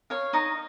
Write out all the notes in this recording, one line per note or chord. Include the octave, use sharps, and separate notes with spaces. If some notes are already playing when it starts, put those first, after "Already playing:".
C#5 F5
D#4 D#5